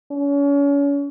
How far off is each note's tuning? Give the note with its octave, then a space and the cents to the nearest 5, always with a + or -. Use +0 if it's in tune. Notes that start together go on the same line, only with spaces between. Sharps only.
C#4 +35